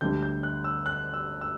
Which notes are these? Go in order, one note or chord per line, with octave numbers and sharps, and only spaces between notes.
D2 D3 G3 D4 G6
G6
F#6
E6
F#6
E6
E6